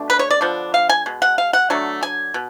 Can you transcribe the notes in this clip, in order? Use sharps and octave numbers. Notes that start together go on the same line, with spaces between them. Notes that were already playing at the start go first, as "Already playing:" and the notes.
Already playing: B2 A3 D4
B4
C#5
D5
D3 F3 B3 D4
F5
G#5
B2 G#3
F#5
F5
F#5
D3 F#3 A3 D4
G#5
B2